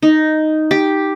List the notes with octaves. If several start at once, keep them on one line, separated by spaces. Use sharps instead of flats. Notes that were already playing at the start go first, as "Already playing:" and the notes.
D#4
G4